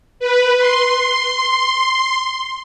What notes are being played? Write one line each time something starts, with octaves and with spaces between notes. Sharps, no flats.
B4
C6